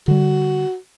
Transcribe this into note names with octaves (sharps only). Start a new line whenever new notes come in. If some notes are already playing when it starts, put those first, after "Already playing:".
D3 G3 F#4